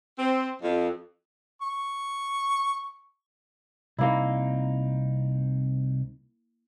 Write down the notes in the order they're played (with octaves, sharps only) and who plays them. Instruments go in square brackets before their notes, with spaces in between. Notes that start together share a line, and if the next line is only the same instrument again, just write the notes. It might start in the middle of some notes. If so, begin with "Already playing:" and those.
[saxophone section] C4
F2
[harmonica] C#6
[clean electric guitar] C2 C4 D#4 [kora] A#3 E4